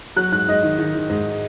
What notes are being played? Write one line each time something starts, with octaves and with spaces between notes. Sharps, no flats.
F#3 F#6
G#2 F#6
G#2 D#5
D#3
D#3
D#3
G#2